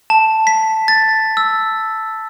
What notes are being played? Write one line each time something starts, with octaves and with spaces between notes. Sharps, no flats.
A5
B6
A6
E6